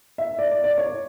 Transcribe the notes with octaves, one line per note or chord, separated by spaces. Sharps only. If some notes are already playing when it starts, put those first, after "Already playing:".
E5
D5
D5
D5
C#5